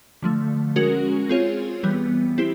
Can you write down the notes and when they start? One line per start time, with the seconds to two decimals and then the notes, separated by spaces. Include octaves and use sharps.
0.22 D3 F3 A3
0.76 G#3 C#4 F#4 A#4
1.29 C4 F4 G#4 C#5
1.83 E3 G3 B3
2.38 C4 E4 G4